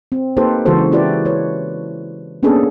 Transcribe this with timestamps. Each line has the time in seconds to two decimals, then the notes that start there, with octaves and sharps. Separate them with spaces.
0.12 C4
0.37 A#3 D#4 G4 A4 B4 C5
0.66 C#3 E3 G#3 F#4 A4 C5
0.92 E4 F#4 G4 B4 D5
1.25 B4 C#5
2.43 A#3 B3 C#4 D4 G#4 A4